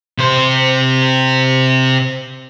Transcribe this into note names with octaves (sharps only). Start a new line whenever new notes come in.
C3 C5